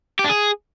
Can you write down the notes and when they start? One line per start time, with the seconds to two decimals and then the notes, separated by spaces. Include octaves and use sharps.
0.19 G4
0.24 D4
0.30 G#4